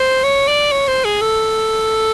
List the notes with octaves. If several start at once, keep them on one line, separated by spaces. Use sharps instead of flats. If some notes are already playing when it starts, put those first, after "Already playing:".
Already playing: C5
C#5
D5
C#5
C5
G#4
A4